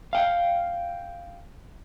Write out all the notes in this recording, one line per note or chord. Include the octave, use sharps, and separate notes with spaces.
F5 G5